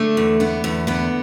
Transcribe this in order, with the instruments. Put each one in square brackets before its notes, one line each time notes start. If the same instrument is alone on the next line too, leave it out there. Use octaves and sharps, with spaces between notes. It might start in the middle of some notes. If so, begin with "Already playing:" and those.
Already playing: [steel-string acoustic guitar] D3 A3
E2
D3 B3
E2
D3 B3